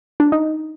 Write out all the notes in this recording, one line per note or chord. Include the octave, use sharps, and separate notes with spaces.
D4
D#4